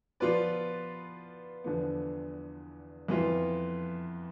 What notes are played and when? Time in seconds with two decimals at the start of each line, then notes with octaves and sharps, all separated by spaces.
0.20 F3 B3 F4 B4 D5
1.64 E2 D3 F3 B3
3.08 F2 E3 B3 F4